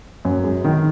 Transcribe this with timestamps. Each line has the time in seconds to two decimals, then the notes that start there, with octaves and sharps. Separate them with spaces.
0.25 F#2
0.44 G#3
0.64 D#3